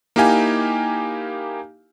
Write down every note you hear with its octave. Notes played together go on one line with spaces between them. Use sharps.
A#3 D#4 E4 G4 F5 G#5